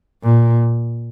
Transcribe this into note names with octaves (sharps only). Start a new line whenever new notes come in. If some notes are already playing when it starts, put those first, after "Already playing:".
A#2